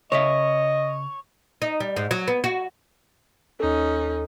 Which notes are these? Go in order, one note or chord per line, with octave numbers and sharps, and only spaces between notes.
C#3 A#4 C#5 D#5 E5
D#4
G3
G#2
F#3
B3
F#4
D#2 C#4 D#4 A4